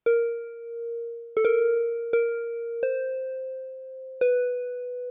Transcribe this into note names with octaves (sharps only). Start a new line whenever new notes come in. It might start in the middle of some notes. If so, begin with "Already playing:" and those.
A#4
A4
A#4
A#4
C5
B4